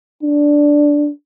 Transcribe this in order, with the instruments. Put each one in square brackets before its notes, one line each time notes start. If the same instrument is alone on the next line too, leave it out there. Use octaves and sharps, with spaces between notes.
[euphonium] D4